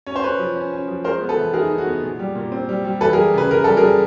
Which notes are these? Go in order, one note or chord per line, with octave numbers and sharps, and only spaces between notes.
C#4 C#5
C5
C#4 B4 C#5
F3
C#4
C#4
F3
G#3 A#4 C5
B3
A4 B4
E3
D#4 G#4 A#4
D#4
F#4
B3
A#2
G3
A#2
C4
G3
G3
E3 A4 B4
G#4 A#4
G3
C#3 B4
C#3 A#4
G3 A4
G#4 A#4
G3